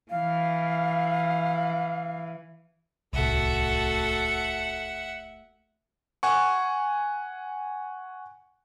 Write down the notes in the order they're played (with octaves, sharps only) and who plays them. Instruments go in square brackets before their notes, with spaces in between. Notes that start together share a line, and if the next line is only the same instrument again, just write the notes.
[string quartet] E3 [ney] F5
[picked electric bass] D1 C2 [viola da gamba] A3 F#4 A4 [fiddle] E5 F#5
[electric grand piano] F#5 G#5 C#6